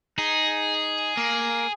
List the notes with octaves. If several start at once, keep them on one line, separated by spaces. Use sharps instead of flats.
D#4 G#4
A#3